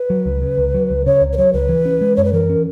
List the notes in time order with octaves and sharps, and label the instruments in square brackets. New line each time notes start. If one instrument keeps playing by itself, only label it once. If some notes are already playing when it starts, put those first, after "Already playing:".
Already playing: [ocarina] B4
[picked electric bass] F#3
C#2
C#3
C#2
F#3
C#2
[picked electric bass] C#3 [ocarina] C#5
[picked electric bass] C#2
[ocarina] B4
[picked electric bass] F#3 [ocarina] C#5
[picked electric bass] C#2 [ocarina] B4
[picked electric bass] E3
C#4
G#3
[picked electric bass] F#2 [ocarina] C#5
[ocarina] B4
[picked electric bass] E3 [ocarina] A#4
[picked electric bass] C#4